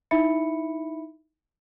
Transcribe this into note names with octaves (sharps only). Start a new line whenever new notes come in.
D#4 E4 E5 B5 C#7